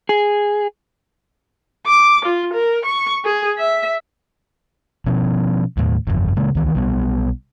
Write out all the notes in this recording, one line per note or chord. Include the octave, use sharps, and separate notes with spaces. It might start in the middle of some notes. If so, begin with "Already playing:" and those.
G#4
D6
F4
A#4
C#6
G#4
E5
B2 F3 B3 C#4
D#2 A2
G1 F2
C#3 G#3 A#3
C#2 D#3 E3
B1 G3 B3